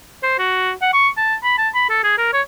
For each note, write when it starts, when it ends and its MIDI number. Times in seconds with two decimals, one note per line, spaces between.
0.23 0.35 72
0.39 0.72 66
0.81 0.90 78
0.93 1.09 85
1.17 1.35 81
1.43 1.54 83
1.58 1.69 81
1.74 1.86 83
1.90 1.99 69
2.03 2.17 68
2.18 2.31 70
2.33 2.41 73